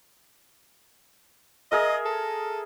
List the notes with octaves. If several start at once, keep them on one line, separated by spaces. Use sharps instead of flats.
G#4 A#4 D#5 E5
A4